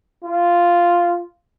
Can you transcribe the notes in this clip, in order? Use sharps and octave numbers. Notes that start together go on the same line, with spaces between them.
F4